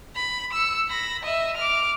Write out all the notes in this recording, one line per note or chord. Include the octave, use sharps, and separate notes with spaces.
B5
E6 C#7
B5 A#6
D#5 E5
D6 F6